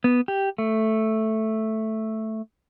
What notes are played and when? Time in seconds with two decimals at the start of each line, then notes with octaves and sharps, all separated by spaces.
0.04 B3
0.28 G4
0.58 A3